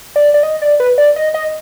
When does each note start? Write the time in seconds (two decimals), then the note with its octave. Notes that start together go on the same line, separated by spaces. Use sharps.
0.16 D5
0.34 D5
0.43 D#5
0.62 D5
0.80 B4
0.98 D5
1.16 D#5
1.34 D#5